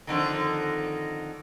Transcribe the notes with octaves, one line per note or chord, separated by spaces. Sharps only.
F2 D3 D#3